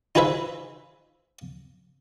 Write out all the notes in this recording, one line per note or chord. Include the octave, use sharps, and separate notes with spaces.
D#4 F4 G#4 B4 C5 E5